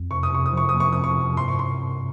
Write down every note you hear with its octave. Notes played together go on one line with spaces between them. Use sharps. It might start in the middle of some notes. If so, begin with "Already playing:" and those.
Already playing: F2
C3 C#6
D#6
C3 C#6
D#6
F3 C#6
D#6
A#3
C#6
C3 D#6
C#6
C3
G2 C6
C#6
C6